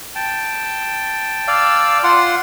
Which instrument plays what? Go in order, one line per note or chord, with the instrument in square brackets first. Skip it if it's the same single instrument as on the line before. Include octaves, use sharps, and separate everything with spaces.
[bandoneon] G5 A5
[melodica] D5 F5 E6
F4 F#5 C6